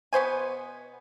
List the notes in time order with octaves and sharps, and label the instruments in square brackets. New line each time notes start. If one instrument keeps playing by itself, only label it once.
[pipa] B2 B3 C5 G#5